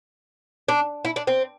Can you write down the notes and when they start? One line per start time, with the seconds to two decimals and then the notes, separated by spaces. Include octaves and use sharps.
0.68 D4
1.05 E4
1.16 D4
1.27 C4